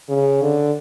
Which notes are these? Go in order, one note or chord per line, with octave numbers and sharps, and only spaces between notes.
C#3
D3